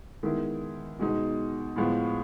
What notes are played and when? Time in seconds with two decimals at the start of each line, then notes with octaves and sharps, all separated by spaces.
0.23 D#3 G#3 B3 E4
0.99 B2 G#3 B3 D#4
1.76 A2 F3 G#3 B3